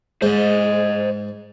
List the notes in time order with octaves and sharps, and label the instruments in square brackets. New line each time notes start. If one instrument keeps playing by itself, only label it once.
[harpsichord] G#2 [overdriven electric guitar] C5 D#5